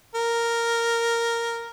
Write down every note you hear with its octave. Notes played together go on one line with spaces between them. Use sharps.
A#4